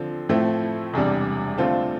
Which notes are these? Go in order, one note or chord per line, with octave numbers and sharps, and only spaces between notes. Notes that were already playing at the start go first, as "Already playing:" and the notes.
Already playing: D3 F3 C4
A2 F3 A3 C4 E4
E1 E2 C3 G3 D4
D3 A3 C4 F4 A4